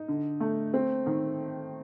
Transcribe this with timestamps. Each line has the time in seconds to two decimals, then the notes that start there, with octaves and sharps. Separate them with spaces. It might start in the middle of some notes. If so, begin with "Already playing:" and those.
Already playing: D#4
0.08 D3
0.40 A3
0.74 C4
1.06 D#3